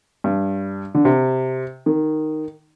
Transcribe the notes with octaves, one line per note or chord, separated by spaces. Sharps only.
G2
D3
C3
D#3